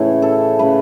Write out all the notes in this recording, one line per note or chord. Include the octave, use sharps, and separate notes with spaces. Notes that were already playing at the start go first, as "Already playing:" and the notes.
Already playing: A2 C#3 E3 A3 C#5
A4
C#3 E3 A3 B4